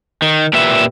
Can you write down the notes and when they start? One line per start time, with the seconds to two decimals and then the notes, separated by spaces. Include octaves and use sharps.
0.22 D#3
0.53 A#2 G4 B4 E5